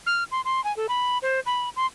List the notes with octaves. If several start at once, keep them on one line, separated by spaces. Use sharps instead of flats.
F6
C6
C6
G#5
A4
B5
C5
B5
C6